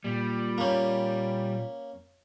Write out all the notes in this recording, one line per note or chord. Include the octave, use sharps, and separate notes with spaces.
A#2 G3
A#3 C#4